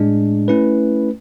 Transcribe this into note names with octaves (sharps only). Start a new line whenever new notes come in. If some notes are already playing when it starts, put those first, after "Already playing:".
Already playing: A2 G#3 D4
A3 C#4 E4 B4